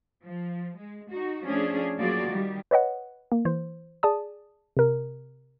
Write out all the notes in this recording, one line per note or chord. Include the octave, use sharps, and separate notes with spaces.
F3
G#3
D#4 F#4
F3 A3 C#4 D4 G#4
F#3 A#3 F4 F#4 G#4 D5
D#3 G3
B4 C#5 D#5 F#5
A#3
E3 C5
G#4 D5 A5 D#6
C3 A#4